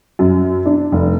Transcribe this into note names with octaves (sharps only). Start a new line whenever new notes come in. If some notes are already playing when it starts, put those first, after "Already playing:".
F#2
D4
F1